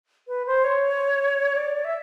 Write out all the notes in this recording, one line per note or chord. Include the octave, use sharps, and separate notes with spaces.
B4
C5
C#5
D5
D5
E5